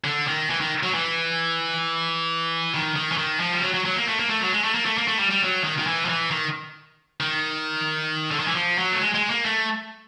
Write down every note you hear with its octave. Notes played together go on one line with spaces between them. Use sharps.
D3
D#3
E3
D#3
F#3
E3
D#3
D#3
E3
D#3
F3
G3
F#3
F#3
F#3
A#3
A3
A#3
A3
F#3
G#3
A3
A#3
A3
A#3
A3
G3
G3
F#3
D#3
D#3
E3
F3
E3
D#3
D#3
D3
D#3
E3
F3
F#3
A3
G#3
G#3
A#3
A3